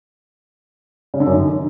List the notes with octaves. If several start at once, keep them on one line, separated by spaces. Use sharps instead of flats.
C#3
D3
F#2
D#3